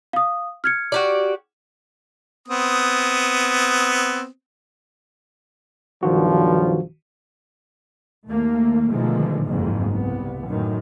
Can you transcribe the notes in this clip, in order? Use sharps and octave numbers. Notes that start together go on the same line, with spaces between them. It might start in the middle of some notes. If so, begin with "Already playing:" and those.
F5 D#6
F6 G#6 C#7
F#4 G4 D5
B3 C4 D#6
B1 G2 D#3 F3 F#4
D#2 A3 A#3
B2 D3 D#3 F3 G#3 A3
F#1 F2 G#2 D#3
C2 B3
F#2 A2 D#3